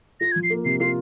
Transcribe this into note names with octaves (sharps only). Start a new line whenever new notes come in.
F4 A#6
G#6
F3
C7
A#3
C3 C7
F4 C7